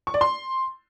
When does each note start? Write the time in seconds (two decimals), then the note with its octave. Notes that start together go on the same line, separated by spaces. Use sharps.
0.07 C#6
0.14 D5
0.21 C6